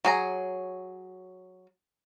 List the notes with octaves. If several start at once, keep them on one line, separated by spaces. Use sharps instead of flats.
F#3 G#4 A#5